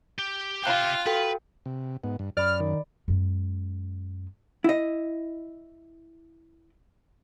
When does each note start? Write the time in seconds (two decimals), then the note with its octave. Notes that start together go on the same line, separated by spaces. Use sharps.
0.19 G4
0.64 F4 G4 E5 F5 G5 F#6
1.06 F#4 A4 B4 G5
1.66 C3
2.04 G#2 B3
2.19 G2
2.37 F#2 D5 B5 F6
2.60 D#3
3.08 F#2 G#3
4.64 E4 D#5